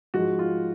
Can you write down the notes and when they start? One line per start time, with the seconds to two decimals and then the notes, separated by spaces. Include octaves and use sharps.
0.14 G#2 F3 G#3 F#4
0.39 F4